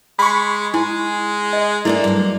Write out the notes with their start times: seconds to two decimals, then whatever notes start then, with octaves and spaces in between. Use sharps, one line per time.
0.19 G#3 B5 C#6
0.74 G#3 E4 G#5
1.53 D#5
1.85 A3 A#3 D4 E4 A4
2.04 G2 F#3